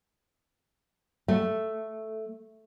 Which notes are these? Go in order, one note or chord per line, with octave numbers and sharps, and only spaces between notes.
A3